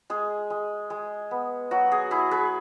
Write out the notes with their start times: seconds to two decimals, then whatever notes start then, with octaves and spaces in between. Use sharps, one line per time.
0.10 G#3 G#4
0.50 G#3
0.90 G#3
1.31 B3
1.71 F#3 F#4
1.92 G#4
2.11 E4 G#4
2.31 G#4 B4